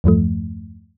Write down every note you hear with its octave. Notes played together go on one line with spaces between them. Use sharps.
E2 G2 F3 A3